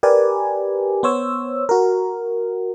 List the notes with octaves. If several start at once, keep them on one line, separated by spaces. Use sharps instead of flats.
G4 A#4 B4 D5 G#5
B3 C5 C#5 E6
F#4 A#4